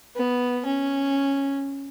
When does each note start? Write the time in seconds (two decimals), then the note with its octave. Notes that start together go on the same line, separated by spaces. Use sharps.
0.16 B3
0.66 C#4